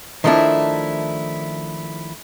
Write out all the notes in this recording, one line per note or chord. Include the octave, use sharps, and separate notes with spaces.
D#3 F3 A3 C#4 D4 E4